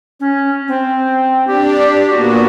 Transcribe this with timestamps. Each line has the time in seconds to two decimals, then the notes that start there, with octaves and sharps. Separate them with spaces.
0.20 C#4
0.68 C4
1.47 D4 G4
2.10 A#2 B3 F#4